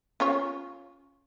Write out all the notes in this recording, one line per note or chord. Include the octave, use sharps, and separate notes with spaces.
C#4 F4 C#5